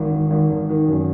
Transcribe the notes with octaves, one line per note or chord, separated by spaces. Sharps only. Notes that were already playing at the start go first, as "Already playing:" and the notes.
Already playing: G#1 D#3
G#1
G#1
G#1
D#3
F#2